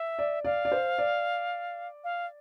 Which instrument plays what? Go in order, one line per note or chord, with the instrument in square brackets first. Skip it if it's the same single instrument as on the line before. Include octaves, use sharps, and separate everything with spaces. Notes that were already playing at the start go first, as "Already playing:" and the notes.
Already playing: [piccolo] E5
[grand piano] D5
[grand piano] D5 [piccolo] F5
[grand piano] D5
C5
D5
[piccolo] F5